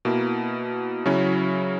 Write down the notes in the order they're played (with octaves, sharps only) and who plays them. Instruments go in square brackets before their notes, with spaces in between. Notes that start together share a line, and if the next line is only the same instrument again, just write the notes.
[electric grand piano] B2 A#3 E4
C#3 F#3 C#4 E4